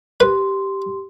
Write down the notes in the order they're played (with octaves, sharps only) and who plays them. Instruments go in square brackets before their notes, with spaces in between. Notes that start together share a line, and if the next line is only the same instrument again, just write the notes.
[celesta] G4 C6 [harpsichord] B4